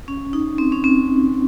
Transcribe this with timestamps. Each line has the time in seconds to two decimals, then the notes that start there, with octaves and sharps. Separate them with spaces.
0.08 C#4
0.33 D#4
0.58 C4
0.72 C#4
0.84 C4